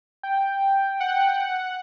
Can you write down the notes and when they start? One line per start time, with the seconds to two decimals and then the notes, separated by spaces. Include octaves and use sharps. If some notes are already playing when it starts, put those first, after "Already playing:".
0.23 G5
1.00 F#5